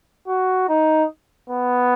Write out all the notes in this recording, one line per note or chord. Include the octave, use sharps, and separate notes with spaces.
F#4
D#4
B3